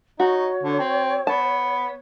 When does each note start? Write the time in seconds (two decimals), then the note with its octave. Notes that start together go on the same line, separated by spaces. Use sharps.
0.20 D#4 F#4 C#5
0.63 D3
0.79 C4
1.27 B3 A5